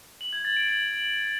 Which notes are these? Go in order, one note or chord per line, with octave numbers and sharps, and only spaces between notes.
F#7
G#6
A6
D7
F#7